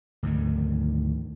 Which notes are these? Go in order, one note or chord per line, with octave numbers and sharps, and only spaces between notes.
D2 G#2 D#3